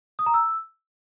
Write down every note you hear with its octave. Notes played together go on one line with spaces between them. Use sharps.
D#6
A#5
E6